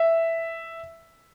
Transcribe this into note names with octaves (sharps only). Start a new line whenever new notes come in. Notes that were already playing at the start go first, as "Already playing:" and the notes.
Already playing: E5